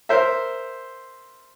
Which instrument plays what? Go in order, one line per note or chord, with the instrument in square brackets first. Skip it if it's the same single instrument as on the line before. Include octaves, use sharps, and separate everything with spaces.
[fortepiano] A#4 C5 E5